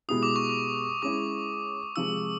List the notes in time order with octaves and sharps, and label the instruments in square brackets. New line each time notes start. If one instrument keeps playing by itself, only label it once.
[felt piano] B2 G#3 B3 E4 G4 [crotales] D#6
[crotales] D6
C#6
D6
[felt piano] G#3 C#4 E4 [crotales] D6
[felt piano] C3 F3 G#3 [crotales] E6